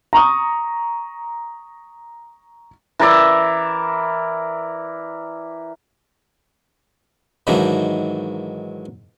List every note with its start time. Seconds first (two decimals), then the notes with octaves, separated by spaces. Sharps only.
0.13 A#5 C#6 D#6
2.99 E3 A#4 D5 E5
7.47 G#2 D#3 E3 F#3 D4